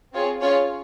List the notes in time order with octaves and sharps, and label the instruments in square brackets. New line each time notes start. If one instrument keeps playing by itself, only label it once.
[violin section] C4 F4 G#4 C#5
C#4 F4 G#4 C#5